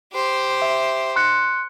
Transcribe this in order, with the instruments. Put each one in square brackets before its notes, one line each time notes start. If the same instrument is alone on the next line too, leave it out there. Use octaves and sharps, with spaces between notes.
[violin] G4 C5
[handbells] E5
C6 F#6 C#7